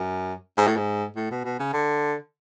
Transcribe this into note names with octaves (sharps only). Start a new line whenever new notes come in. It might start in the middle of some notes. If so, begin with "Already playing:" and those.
Already playing: F#2
G#2
A2
G#2
A2
B2
B2
C#3
D3